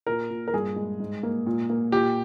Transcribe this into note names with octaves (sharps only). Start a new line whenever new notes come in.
A#2 A#4
A#2
A#4
G2 G#4
G#3
G#2
A#3
A#2
A#3
A#2 G4